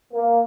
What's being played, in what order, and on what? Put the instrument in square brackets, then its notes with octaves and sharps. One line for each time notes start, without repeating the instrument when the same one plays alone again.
[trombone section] A#3